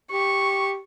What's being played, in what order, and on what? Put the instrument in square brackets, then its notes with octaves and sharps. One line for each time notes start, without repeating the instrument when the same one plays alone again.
[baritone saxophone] G4 [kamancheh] C#6